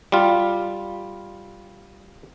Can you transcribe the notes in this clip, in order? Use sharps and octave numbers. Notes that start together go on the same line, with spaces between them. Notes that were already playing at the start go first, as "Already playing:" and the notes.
G3 F4